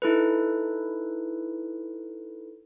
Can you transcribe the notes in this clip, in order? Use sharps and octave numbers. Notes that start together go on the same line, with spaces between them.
D#4 E4 A4 B4